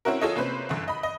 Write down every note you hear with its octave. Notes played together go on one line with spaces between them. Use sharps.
C4 C#4 E4 F#4 A#4
F4 G#4 A4 C#5 D#5
C3 A#3 C#4 B4 C5
G1 F#2 D3
D#5 B5
D#5